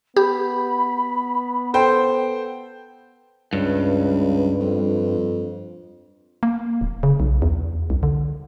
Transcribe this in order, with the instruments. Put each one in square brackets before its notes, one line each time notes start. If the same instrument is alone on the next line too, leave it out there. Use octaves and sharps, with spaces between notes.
[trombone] B3 [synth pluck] G4 [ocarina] B5
[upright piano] A4 C5 G5
[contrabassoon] C#2 [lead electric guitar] G2
[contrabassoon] F2
[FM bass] A#3
D1
C#3
B1
E2
C2
D3